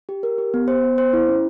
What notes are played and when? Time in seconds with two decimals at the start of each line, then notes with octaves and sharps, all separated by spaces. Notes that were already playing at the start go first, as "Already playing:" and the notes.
0.09 G4
0.23 A#4
0.38 G4
0.54 B3
0.68 C5
0.83 B3
0.98 C5
1.13 E4
1.28 C#4